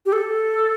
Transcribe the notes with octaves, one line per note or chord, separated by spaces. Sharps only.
G4
A4